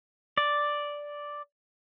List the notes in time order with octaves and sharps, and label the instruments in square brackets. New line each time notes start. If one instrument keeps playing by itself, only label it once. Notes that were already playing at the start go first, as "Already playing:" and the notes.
[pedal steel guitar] D5